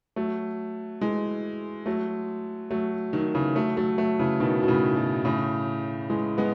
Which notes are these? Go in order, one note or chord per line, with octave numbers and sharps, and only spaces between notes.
F#3 A3
E3 G#3
F#3 A3
F#3 A3
D#3 F#3
C#3 E3
F#3 A3
F#3 A3
F#3 A3
C#3 E3
B2 D#3
B2
A2 C#3
B2
A2 C#3
E3 G#3
G#3 B3